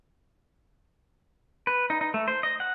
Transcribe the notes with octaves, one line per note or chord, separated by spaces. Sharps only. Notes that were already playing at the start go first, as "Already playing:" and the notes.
B4
D#4
D#4
A3
C5
D#5
F#5